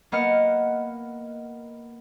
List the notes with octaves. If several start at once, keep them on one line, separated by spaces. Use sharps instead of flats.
A#3 B3 D#5 F#5 F6 C#7